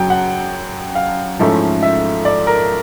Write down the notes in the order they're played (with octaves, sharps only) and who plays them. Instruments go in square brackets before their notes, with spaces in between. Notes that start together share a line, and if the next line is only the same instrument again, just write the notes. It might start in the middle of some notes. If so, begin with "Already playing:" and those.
Already playing: [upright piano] F#2 C#3 F#3 G5
F#5
F5
G#2 F3 A3 C#4 E4
E5
D5
A#4